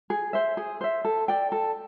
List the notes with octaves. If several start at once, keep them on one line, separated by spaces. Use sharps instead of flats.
G#4
C5 E5
G#4
C5 E5
A4
D5 G5
A4